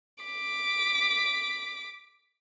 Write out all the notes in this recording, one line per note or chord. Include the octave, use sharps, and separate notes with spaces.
D6 B6